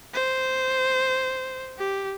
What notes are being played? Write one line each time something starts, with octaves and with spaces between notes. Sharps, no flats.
C5
G4